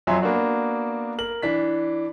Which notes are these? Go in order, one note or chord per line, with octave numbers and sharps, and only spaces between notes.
F2 F#3 E5 G#5 C6
A#3 B3 D4 F#4
A#4 F#7
E3 D4 B6